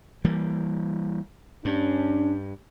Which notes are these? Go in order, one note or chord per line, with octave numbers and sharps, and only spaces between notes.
E3 G3 A#3
G2 C#4 D4